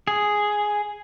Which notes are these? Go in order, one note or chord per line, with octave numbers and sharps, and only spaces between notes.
G#4